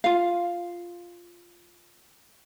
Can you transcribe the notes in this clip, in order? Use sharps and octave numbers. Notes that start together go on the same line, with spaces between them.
F4 F5